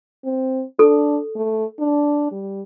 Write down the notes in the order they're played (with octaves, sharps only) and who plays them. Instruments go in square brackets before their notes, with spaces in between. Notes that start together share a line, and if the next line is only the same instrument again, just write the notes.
[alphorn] C4
[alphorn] D4 [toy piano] A4
[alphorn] A3
D4
G3